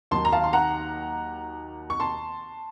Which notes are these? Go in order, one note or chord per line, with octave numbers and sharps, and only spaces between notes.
D#2 D#3 F#3 A5 C6
A#5
F5 A5
C6
F#5 A#5
C#6
A5 C6